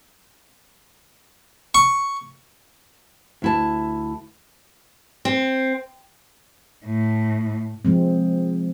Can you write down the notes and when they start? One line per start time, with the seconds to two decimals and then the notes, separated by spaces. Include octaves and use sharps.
1.75 C#6
3.42 D2 E4 A5
5.25 C4
6.86 A2
7.85 F3 G#3 C4